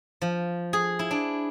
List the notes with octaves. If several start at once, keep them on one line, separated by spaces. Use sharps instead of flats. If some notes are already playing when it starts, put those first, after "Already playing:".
F3
G#4
E4
D4